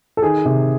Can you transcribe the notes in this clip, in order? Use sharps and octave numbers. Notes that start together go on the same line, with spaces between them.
A4
D#3 G#4
C3